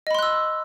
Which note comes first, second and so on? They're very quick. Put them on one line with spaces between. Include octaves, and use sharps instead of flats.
D#5 B5 C6 F#6 E6